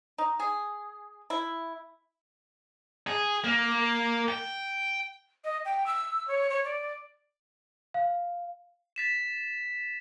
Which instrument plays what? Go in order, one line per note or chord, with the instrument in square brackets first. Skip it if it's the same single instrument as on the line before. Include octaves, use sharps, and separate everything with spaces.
[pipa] D#4
G#4
E4
[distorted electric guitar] G#4
A#3
G5
[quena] D#5
G5
E6
C#5
C#5
D5
[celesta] F5
[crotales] A6 B6 E7